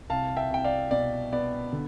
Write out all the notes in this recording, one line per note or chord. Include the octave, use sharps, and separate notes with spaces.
C2 F5 A5
E5 G5
C2 G5
D5 F5
B2 D5
B3 D5
D3